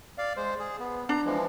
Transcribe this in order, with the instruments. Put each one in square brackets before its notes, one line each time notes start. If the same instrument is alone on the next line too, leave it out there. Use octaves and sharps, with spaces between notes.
[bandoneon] D5 F5
G#3 C5
G#4
B3
[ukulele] D4 [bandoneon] A#5
[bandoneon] E3 F3 G#3